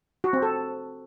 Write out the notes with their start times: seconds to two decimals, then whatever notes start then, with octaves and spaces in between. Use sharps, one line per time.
0.24 F#4
0.33 C4
0.42 A4